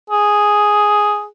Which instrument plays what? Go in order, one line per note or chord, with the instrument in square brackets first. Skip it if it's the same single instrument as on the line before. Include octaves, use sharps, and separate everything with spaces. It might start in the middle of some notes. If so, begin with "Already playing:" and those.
[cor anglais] G#4